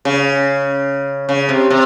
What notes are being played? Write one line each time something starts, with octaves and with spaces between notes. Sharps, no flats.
C#3
C#3
C3
C3